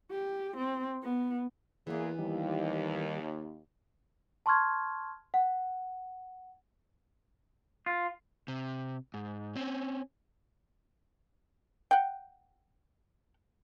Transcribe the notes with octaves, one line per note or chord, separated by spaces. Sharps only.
G4
C4
B3
E2 E3 A#3 B3 G#4
D#2 D#3 G3
A5 C6 C#6 F6 G#6
F#5
F4
C3
G#2
C4 C#4
F#5 G5